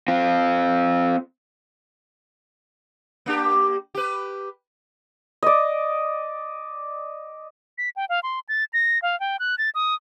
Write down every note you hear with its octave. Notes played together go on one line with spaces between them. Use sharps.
C4 F4
A#3 D4 G4
G4 B4
D5 D#5
B6
G5
F5
C6
A6
A#6
F5
G5
F#6
A6
D#6